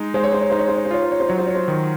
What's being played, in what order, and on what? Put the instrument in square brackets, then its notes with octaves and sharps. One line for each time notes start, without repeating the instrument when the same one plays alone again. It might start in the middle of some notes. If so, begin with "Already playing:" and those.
Already playing: [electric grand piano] G#3 D#4
[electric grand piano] G#3 [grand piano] C5
[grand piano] C#5
C5
C#5
[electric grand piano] D#4 [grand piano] C5
[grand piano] C#5
C5
C#5
C5
[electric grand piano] F4 [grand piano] C#5
[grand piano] C5
C#5
C5
[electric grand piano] F#3 [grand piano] C#5
[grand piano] C5
C#5
C5
[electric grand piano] D#3